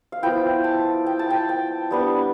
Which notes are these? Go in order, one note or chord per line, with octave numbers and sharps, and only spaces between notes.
F5
F3 B3 E4 G5
A5
G5
A5
G5
G5
G3 B3 D4